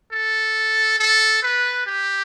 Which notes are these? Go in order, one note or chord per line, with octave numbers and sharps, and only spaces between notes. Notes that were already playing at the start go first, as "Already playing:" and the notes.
A4
A4
B4
G4